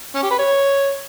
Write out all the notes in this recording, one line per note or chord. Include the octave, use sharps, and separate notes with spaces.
C#4
G4
B4
C#5